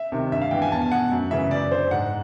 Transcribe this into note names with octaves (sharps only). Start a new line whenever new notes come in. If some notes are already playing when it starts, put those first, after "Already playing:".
Already playing: E5
C3 D#3
G2 E5
F5
E3 G5
G#5
E2 A5
G#5
B2 F#5
F#2
C#3 E3 E5
F#2 D5
D3 C5
G#2 F#5